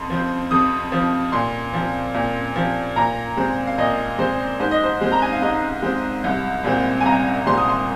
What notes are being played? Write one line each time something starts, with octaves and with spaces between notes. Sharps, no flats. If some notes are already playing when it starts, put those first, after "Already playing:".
Already playing: F2 C6
F3 C4
F2 D#6
F3 C4
A#2 C6
F3 C4
A#2
F3 C4
A#2 A#5
G#3 C4
F5
A#2 D#5
G#3 C4 C5
G#2 C5
D#5
C5
G#3 C4
A#5
G#5
F5
G#2 D#5
G#3 C4
C2
A#2 G#3 C4
G#5
C2 A#5
A#2 G#3 C4 C6
D#6
C6